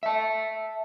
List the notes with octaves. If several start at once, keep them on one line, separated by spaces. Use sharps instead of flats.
E5 A5